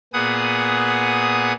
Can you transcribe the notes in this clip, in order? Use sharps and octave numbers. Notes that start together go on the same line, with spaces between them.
A#2 B3 G#4 F#5 D#6